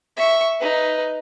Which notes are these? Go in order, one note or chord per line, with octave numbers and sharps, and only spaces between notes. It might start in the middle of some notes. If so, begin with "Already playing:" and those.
E5 C#6
D#4 B4